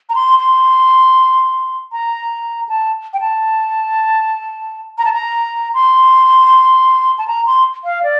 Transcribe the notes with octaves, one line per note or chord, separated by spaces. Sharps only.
A#5
C6
C6
A#5
A5
G5
A5
A#5
A5
A#5
C6
A5
A#5
C6
F5
D5